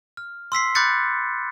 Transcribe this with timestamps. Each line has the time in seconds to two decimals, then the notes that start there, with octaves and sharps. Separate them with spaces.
0.17 F6
0.52 C6 E6 B6 C7
0.75 B5 D6 F#6 G6 A6 C#7